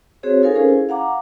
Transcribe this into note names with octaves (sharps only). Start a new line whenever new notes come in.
C4 F#4 G#4 C5 C#5
D#4 F4 A4 A#4 F5 G#5
C#4 G#4 C5
E4
F5 F#5 A#5 D6